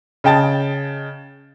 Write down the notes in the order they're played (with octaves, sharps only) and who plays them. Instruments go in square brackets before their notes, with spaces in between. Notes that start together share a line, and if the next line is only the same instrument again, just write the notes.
[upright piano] C#3 D#5 G5 A5 A6